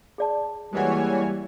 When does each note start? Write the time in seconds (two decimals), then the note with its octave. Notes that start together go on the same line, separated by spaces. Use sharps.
0.18 G#4 D5 A5
0.73 E3 G3 G#3 A#3 F#4 C#5 G#5